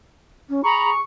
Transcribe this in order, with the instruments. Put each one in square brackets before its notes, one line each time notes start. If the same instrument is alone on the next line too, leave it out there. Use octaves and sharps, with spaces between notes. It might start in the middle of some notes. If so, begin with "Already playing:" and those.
[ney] C#4
[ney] G#4 [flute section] A#5 B5 [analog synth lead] C#6